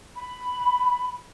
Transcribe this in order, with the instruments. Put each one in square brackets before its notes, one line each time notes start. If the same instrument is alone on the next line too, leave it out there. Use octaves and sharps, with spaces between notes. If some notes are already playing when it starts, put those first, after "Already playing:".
[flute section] B5